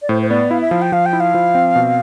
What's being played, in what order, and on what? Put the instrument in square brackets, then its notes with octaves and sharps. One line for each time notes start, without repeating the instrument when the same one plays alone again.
[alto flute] D5
[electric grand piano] A2 [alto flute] C5
[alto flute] C5
[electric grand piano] B3 [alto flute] D5
[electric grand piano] E4 [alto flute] F5
[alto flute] E5
[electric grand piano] F3 [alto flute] F5
[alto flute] G5
[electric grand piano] F3 [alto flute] F5
[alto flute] G5
[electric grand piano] E4
[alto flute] F5
[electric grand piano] F3
C4
B2